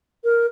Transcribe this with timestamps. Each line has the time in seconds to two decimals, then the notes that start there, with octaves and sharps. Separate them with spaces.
0.24 A#4